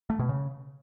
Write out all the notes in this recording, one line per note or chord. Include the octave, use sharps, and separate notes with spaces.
A3
B2
C#3